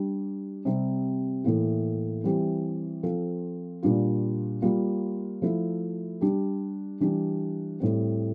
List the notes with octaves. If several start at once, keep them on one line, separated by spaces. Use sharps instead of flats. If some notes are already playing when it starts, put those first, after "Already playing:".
Already playing: G3 D4 G4
C3 G3 C4
A2 E3 A#3 E4
E3 G3 C4 E4 G4
F3 C4 F4 A4
A#2 G3 D4 F4
G3 A#3 F4
F3 A3 E4
G3 D4 G4
E3 G3 D4 G4
A2 G3 C4